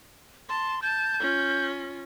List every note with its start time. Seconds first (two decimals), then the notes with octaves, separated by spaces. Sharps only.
0.49 A5 C6
0.82 A5 G6
1.20 C#4 F4